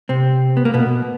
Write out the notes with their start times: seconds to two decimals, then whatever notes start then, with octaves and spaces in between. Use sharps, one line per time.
0.09 C3 C4
0.57 B3
0.65 A#3
0.74 B2 B3